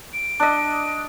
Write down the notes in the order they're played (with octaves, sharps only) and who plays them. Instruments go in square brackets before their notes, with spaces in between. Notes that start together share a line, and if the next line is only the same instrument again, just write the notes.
[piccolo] D7
[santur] D4 D#5